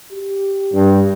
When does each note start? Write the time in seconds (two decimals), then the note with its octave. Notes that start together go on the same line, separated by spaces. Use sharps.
0.12 G4
0.72 G2